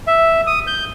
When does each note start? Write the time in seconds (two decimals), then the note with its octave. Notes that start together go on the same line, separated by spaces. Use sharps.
0.07 E5
0.47 D#6
0.67 G6